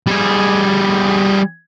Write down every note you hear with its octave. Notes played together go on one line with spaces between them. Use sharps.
G3 G#4